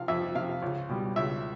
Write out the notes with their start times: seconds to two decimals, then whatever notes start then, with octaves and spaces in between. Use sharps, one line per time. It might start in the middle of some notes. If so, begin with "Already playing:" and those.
Already playing: C3 F3 F5
0.08 F2 E5
0.35 C3 F3 F5
0.62 C#2
0.89 B2 G3
1.16 C#2 E5